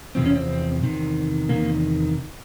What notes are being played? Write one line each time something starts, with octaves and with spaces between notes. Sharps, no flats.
E2 C3 F3 C4
C#4
C4
E2 C3 D#3
E2 C3 D#3 A#3